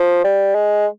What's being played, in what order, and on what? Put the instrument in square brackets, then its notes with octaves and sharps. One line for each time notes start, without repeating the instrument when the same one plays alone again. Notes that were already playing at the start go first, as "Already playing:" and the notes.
Already playing: [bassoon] F3
G3
G#3